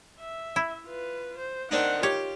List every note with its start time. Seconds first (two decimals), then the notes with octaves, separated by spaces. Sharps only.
0.20 E5
0.56 E4
0.85 F4 B4
1.38 C5
1.71 D#3 C4 D4 D#4 F#5
2.03 F4 G4 C#5